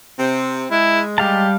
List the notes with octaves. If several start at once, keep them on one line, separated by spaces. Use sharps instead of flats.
C3 C4
G#3 E4
G3 G4 F5 A5